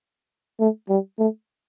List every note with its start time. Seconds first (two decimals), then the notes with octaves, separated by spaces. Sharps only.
0.60 A3
0.89 G3
1.19 A3